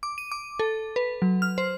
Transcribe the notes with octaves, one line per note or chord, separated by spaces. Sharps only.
D6
D#7
D6
A4
B4
F#3
F6
C5